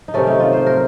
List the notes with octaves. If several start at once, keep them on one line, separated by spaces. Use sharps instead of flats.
D#4
C3 D#3 A3 C#4
D#4
F4
C5
A#4